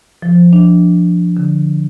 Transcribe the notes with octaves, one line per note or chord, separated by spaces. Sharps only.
F3
D4
D3